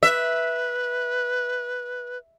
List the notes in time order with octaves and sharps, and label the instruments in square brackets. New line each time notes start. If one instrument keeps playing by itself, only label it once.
[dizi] B4 [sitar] E5